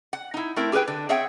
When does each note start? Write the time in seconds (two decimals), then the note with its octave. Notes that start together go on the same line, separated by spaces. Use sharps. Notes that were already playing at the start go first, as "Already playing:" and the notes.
0.13 F#5
0.34 D#4 E4
0.56 A3 C4 E4 A#4
0.72 G4 G#4 A#4 B4 G5
0.88 D3
1.09 C4 G#4 C#5 E5 F#5 G5